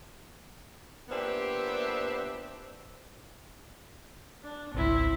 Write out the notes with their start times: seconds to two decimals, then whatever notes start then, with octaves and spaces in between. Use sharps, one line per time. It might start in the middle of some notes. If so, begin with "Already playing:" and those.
1.09 A#2 B3 C4 D4 G4 E5
4.43 D4
4.74 G#1 C#2 C4 E4